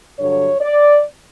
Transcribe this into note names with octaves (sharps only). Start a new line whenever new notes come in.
G2 D3 F#3 C#5
D5